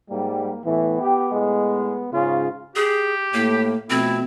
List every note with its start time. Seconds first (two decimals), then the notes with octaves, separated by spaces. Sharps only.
0.10 G#2 G3 A#3
0.65 A2 E3 B3
1.00 G4
1.32 A2 G#3
2.13 G#2 C#3 F4
2.76 G4 G#4
3.34 A2 A#3
3.90 B2 F3 A3 C4 E4